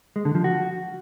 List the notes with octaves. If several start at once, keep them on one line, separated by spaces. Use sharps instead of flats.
G#3
D3
F3
F#4